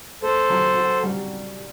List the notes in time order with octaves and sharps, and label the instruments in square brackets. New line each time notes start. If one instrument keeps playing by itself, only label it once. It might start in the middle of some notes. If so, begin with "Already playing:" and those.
[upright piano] A3 [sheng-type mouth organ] A4 C5
[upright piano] F#3
F#4
G3